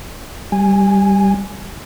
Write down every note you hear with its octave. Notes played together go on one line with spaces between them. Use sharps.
G3 G#5